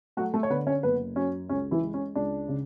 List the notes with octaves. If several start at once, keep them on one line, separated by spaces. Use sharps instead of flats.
F#3 A3 F#4
A3 A4
C#5
D3 B3 B4
C#4 C#5
F#1 B3 B4
F#2 C#4
C#2 C#4
E3 E4
G#3
C#4
C#2 D4
C#3